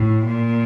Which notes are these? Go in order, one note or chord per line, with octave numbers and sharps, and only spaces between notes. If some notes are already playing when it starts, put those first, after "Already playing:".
Already playing: A2
A#2